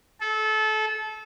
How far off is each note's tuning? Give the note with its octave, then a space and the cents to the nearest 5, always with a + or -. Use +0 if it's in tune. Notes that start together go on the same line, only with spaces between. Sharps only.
A4 -25